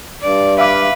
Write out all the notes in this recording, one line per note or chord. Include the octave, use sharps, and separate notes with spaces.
G2 D5
B4 E5 F5 D6